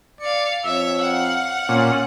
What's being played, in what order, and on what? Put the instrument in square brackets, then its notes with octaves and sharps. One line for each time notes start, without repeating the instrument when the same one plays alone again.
[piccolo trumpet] D5 [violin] F5 C#7
[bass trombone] F2 [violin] C#5 E5 [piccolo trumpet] E6
[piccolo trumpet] F5 [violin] F#5
[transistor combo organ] A#2 [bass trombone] C#4